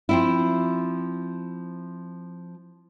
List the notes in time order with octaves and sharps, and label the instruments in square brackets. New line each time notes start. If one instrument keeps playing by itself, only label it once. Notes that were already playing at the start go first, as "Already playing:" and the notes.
[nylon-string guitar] F3 C4 E4